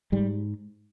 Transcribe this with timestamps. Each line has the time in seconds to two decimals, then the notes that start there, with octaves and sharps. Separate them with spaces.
0.12 G#2 G3